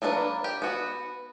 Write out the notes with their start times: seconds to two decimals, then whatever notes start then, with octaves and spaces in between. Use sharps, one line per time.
0.02 F#3 A#3 D4 G#4 B4
0.44 G4
0.62 B3 F#4